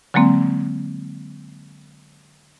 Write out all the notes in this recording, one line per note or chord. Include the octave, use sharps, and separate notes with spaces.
D3 F#3 G#3 A#3 C4